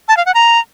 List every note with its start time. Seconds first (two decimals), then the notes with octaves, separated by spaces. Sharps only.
0.08 A5
0.17 F5
0.26 F#5
0.34 A#5